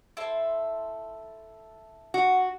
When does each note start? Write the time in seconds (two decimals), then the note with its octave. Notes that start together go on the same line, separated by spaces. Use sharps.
0.17 E4 A4 C5
2.14 F#4